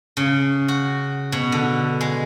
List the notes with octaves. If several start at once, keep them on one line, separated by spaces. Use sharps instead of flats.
C#3
F#4
B2
D3
G#3